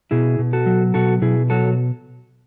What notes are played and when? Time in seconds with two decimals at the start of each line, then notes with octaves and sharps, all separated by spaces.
0.11 B2 E4 G#4
0.39 B2
0.53 F#4 A4
0.66 F#3
0.94 B2 F#4 A4
1.22 B2 E4 G#4
1.50 F#3 F#4 A4